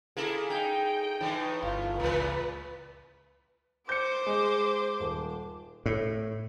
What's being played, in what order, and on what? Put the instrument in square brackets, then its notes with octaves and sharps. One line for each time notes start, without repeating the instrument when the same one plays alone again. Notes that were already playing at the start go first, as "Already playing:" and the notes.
[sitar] A#3 E4 A4 [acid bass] G#4
[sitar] D#4 [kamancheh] G5
[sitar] A2 E3 [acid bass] D#4
[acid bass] G1 [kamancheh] F4
[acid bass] C#2 [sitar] A2 E3 [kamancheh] B4
[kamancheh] C5 D6 [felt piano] G6 C#7
[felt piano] G#3
D#1
[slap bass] A2